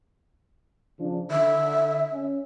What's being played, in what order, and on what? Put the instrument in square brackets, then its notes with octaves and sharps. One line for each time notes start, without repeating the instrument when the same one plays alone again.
[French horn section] C#3 F3 D4
[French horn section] D3 [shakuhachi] E5
[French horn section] C#4